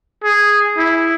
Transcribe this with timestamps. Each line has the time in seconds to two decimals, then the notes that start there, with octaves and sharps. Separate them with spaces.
0.24 G#4
0.78 E4